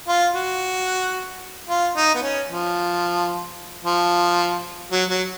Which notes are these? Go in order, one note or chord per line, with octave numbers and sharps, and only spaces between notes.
F4
F#4
F4
D#4
B3
C#4
F3
F3
F#3
F#3